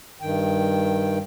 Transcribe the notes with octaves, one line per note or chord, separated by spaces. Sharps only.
G2 D#3 G5